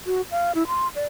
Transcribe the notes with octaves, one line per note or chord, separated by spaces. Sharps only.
F#4
F5
E4
C6
D5